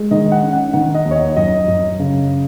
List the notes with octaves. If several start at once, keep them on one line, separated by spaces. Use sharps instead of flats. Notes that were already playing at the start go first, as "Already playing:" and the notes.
Already playing: G#3
D#3 D#5
F#5
C#4
F#5
D#3 F#5
D#5
D#2
C#5
D#5
F#2 D#5
F#2
C#3